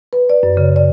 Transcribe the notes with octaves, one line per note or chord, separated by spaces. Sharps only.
B4
D5
F#2
C#3
D5